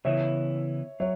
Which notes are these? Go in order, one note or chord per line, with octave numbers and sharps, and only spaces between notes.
C#3 E3 B3 E4 C#5 E5
F#3 C#5 E5